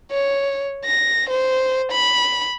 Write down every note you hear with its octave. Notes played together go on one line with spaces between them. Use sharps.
C#5
A#6
C5
B5